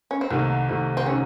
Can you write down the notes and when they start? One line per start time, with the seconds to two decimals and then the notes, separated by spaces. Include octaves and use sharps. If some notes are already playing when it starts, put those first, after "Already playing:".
0.11 C#4
0.21 C4
0.30 C2 C3 D#3 A3 A#3
0.69 C2 C3 D#3 A3
0.97 C4
1.06 C3 D#3 C#4